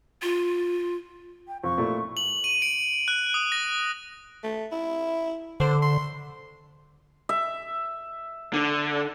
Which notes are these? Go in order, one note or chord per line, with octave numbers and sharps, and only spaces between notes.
F4
G5
F2 C#6
A#2 A3 E4
F#7
D#7
D7
F#6
D#6
A#6
A3
E4
D3 C5
C6
E5
D3